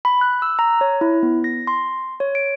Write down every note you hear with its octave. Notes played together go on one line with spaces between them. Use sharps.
B5
F#6
E6
A#5
C#5
E4
B3
A#6
C6
C#5
D7